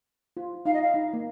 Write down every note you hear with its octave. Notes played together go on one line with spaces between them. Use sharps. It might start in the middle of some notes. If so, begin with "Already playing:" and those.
F4
D#4 F5
D#5
F5
D#4
A#3